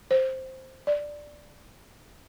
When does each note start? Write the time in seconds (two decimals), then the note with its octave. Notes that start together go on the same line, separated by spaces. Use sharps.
0.11 C5
0.87 D5